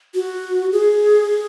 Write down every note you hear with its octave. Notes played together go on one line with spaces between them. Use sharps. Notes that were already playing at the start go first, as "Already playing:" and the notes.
F#4
G#4